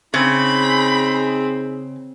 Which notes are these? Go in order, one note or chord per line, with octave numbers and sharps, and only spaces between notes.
C#3 C4 D#4 G#4 B5